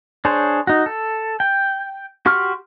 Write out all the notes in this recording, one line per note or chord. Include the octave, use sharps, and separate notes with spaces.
D4 G#4 C5 C#5
D#4 F#4
A4
G5
F#4 G4 C6 C#6 F6